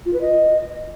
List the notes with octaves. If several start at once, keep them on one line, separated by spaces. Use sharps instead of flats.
F4
B4
D#5